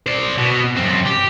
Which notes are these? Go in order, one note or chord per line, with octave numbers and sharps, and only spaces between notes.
C5 D5
B2
F#2 C4
G4